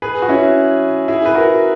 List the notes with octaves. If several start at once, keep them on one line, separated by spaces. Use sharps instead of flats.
G#4 B4
F#4
C#4 E4
E4 G#4
B4
F#4 A#4